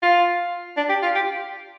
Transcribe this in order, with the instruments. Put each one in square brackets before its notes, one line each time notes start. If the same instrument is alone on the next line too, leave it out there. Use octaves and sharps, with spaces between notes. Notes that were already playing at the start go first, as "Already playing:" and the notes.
[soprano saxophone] F4
D4
G4
F4
G4